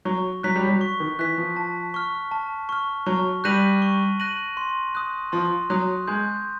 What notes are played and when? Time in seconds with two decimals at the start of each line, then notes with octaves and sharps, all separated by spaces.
0.05 F#3 C#6
0.43 F#3 F#6 B6
0.56 G3
0.68 F#3
0.81 C#6
1.00 D#3
1.19 E3 F#6 B6
1.38 F3
1.56 A5
1.94 C#6 F6
2.31 A5
2.69 C#6 F6
3.06 F#3 C#6
3.44 G3 F#6 A#6 D#7 F#7
3.82 C#6
4.20 F#6 A#6 D#7 F#7
4.57 C6
4.95 D#6 F#6
5.32 F3 C6
5.70 F#3 D#6 F#6
6.07 G#3 G6